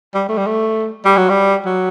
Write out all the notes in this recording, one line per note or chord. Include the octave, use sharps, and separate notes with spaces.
G3
A3
G3
A3
G3
F#3
G3
F#3